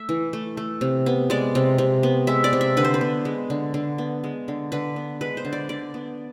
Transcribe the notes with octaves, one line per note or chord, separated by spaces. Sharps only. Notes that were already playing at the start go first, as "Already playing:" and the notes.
Already playing: A3 E5
E3
A3
A3
C3
B3
G#3 D5
C3
C3
B3
G#3 E5
D5
C3
E5
D3 B4
C5
B4
B3
G#3
D3
D3
B3
G#3
D3
D3 B4
B3
G#3 B4
C5
D3
D5
D3 D5
B3